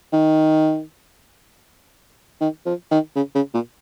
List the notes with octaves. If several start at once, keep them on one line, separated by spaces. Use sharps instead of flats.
D#3
D#3
F3
D#3
C#3
C#3
A#2